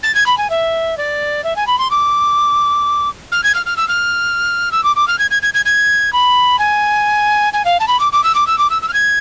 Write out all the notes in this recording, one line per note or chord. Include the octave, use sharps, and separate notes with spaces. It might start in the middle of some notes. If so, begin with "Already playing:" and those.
A6
G#6
B5
G#5
E5
D5
E5
G#5
B5
C6
D6
F6
G#6
F6
F6
E6
F6
E6
D6
D6
F6
G#6
G#6
G#6
G#6
G#6
B5
G#5
G#5
F5
A5
B5
D6
D6
E6
D6
E6
D6
E6
E6
F6
G#6